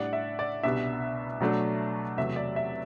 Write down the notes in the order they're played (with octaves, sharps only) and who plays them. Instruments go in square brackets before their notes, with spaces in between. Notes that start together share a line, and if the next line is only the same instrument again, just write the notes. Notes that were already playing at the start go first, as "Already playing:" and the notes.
Already playing: [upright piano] A2 G3 D4 D5 F#5
E5
D5
C2 B2 G3 B3 D4 E5
B2 F#3 A3 D4
E2 C3 F#3 A3 E5
D5
E5